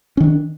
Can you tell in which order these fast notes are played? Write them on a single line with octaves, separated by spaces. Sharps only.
C#4 D#3 D4